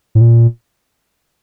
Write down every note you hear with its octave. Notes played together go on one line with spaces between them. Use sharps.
A2
A#2